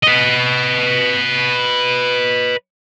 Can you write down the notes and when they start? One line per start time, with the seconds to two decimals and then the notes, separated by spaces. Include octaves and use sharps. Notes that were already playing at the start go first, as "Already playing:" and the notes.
0.03 B4 D#5